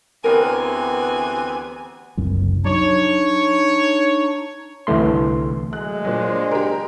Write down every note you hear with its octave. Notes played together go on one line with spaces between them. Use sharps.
D2 E3 B3 C4 G4 A#4 C#5 G#5
F#1 C2 F#2
F#3 D4 D#4 C#5
C2 D3 E3 A3 C6
F#3 G#3 A3 F#6
A#2 F#3 D4 C5
G4 A#4